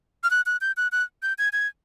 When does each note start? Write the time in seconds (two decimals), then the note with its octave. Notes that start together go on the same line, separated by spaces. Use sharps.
0.24 F6
0.31 F#6
0.46 F#6
0.61 G6
0.77 F#6
0.92 F#6
1.23 G6
1.38 G#6
1.53 G#6